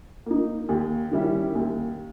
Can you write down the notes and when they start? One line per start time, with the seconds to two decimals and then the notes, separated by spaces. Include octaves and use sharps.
0.26 A#3 D#4
0.69 D#2
1.12 D#3 G3 C#4 E4
1.55 D#2